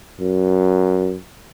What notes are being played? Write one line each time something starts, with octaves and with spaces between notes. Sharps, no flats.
F#2